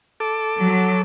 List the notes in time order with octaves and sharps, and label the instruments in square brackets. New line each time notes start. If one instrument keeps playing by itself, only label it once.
[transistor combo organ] A4 D6
[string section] F#3